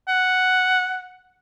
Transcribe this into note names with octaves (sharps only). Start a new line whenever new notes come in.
F#5